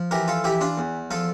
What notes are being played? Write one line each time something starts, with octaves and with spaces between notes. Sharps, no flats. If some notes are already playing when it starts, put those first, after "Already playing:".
Already playing: F3
E3 G4 A#4
F4 A4
E3 E4 G4
D4 F4
E2
F3 F4 A4